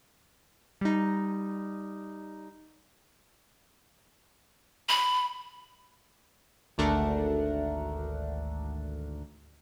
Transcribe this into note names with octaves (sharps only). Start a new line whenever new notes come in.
G3 D#4
B5
G#1 D2 A3 D4 A#4 F#5